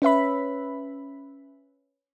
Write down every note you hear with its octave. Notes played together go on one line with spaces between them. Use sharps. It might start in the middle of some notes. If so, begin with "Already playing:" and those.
C#4 B4 E5 B5